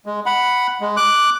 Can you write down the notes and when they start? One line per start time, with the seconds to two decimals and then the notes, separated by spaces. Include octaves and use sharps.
0.06 G#3
0.26 F#5 B5
0.81 G#3
0.97 D6 F#6